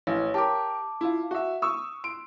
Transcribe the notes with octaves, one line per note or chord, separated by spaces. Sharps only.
A1 C#5 F5
G4 A#4 A5 D6
E4 F4
F#4 E5
C#6 D#6 E6
C6 D7